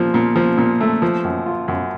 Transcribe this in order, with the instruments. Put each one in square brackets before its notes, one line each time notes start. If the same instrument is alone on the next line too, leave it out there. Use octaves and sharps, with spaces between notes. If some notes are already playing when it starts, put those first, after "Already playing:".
Already playing: [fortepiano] A#2 F3
A#2
F3
A#2
A3
F3
F#2
F4
F#2